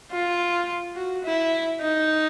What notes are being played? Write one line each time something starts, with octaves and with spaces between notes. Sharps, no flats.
F4
F#4
E4
D#4